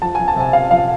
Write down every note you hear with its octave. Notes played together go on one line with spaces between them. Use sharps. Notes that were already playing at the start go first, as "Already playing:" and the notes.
F3 A5
G#5
F3
A5
C3 G#5
C3 F5
F3 F5